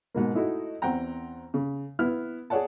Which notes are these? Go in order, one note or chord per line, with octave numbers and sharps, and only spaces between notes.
G#2 B2 A#3
A3 D#4 E4 F#4
E2 C4 F#5 G5 A#5
C#3
B3 E4 F6
G#4 C#5 D5 F#5 A5